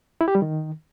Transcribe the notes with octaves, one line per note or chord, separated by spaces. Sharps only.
E4
G4
G3
D#3